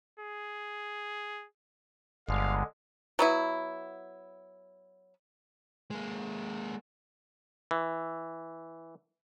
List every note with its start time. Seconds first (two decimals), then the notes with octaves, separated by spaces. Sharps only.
0.20 G#4
2.29 G1 D3 G#3 F5
3.19 F#3 B3 E4
5.91 G#3 A#3
7.71 E3